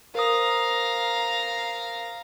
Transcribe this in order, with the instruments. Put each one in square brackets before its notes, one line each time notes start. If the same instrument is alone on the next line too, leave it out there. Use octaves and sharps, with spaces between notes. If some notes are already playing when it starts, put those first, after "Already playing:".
[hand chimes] A#4 C5 D#6 [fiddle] F5 A#5